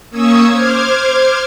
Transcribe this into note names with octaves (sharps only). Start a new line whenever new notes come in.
A#3 C#4 C#6 D#6 E6 G#6
C5 D6 F6 G#6